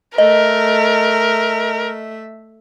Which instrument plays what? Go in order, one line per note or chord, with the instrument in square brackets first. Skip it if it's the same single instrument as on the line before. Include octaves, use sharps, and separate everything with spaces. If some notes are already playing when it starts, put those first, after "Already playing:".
[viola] A3 E5 [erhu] A#4 [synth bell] D#5